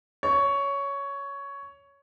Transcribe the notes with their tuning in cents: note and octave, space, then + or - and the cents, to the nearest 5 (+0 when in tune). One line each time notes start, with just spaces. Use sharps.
C#5 +10